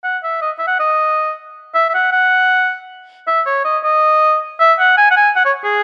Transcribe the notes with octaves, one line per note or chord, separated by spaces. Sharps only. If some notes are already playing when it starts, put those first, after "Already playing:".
F#5
E5
D#5
E5
F#5
D#5
E5
E5
F#5
F#5
E5
C#5
D#5
D#5
E5
F#5
G#5
F#5
G#5
F#5
C#5
G#4